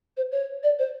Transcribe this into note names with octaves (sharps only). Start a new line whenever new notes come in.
C5
C#5
D5
C5